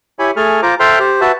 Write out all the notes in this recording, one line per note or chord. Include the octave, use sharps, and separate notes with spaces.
E4 G4 C#5 G#5 B5
A3 G#4 A4 G#5 F6
F4 C5 A#5 D6
A4 C5 E5 G5 C6 F6
G4 C5
F#4 B4 E5 A5